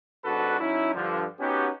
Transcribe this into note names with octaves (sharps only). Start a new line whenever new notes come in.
G#1 G#2 D4 F#4 A4 B4
F#3 C#4 D#4 E4
G2 D3 F3
B3 C#4 D#4 F#4 G4